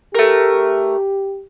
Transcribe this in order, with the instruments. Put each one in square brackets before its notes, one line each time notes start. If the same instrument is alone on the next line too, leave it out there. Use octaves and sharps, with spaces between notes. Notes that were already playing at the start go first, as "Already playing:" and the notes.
[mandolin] A3 A#4 [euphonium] G4